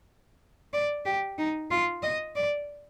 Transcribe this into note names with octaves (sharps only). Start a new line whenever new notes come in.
D5
G4
D#4
F4
D#5
D5